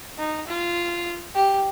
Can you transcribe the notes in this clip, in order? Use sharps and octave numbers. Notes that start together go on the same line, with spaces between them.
D#4
F4
G4